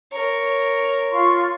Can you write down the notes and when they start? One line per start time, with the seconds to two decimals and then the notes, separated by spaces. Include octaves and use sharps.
0.12 A#4 C#5
1.10 F4 C6 C#6